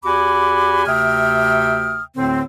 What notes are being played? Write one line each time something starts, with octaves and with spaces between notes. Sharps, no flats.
E2 F#4 G4 G#5 B5 D6
D2 C3 E5 G5 D#6 F6
D2 A2 D3 C4